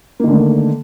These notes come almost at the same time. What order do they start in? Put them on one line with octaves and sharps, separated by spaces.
A#3 D#3 D3 A3